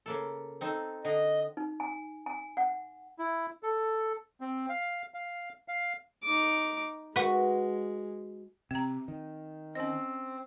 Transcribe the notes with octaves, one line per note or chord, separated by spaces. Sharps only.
C#3 A#3 A4
C4 D#4 A4
D3 D#5
D#4
G#5
G#5
F#5
E4
A4
C4
F5
F5
F5
D#4 D6
G#3 F#4 B4
C3 C4 A#5
D#3
C4 C#4 D#5